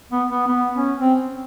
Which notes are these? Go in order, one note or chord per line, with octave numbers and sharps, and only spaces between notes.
B3
B3
B3
C#4
C4